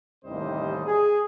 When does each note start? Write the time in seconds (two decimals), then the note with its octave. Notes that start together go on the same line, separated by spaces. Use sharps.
0.25 A1 D#2 C3 G3 C5 D#5
0.86 G#4